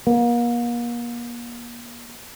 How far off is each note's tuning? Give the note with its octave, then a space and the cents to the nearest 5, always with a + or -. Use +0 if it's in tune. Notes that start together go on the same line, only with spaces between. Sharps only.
A#3 +40